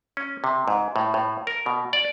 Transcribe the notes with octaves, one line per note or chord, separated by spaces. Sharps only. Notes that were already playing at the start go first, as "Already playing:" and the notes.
C#4
C3
G#2
A2
A2
A#4
B2
D5